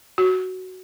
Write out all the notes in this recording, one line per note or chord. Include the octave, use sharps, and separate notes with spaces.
F#4